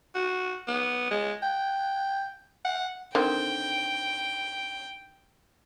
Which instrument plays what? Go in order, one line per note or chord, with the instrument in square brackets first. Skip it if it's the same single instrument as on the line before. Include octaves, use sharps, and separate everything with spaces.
[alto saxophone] F#4
B3
G#3
G5
F#5
[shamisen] D3 D#3 C4 [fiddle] G5